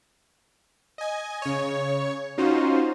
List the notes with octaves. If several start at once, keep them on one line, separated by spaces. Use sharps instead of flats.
D#5 G#5
C#3 C#5
C#4 D#4 F4 F#4 C5